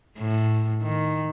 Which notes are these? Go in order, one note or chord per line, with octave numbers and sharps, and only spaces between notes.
A2
D#3